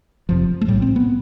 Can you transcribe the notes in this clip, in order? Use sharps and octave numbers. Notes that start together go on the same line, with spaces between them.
F1 F2 C3 F3
A3
B1 A2 G3
C4
B3